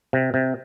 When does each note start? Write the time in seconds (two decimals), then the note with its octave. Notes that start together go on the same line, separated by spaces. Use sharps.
0.13 C3
0.34 C3